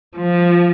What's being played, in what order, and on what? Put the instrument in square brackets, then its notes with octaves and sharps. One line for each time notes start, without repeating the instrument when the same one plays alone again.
[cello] F3